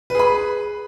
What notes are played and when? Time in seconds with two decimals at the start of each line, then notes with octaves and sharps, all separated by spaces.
0.10 B4
0.15 G#4
0.19 B5